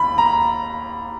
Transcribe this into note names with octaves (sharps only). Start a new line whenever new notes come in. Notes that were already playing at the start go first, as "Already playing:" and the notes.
Already playing: D#2 B5
A#5